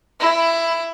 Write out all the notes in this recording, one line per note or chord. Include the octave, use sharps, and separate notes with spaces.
E4